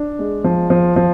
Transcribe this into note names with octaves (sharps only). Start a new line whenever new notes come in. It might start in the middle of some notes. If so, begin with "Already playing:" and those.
Already playing: D4
G#3
F3
F3
F3